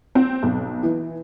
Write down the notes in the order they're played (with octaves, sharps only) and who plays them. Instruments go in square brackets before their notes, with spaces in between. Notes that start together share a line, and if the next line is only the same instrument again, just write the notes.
[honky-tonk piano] C4
B1
E3